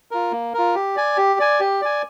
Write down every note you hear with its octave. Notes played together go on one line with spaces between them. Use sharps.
F4 A#4
A#3
F4 A#4
G4
D5 G#5
G4
D5 G#5
G4
D5 G#5